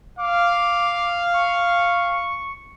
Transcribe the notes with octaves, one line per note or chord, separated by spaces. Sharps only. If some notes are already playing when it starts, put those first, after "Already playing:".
F5 D6
C#6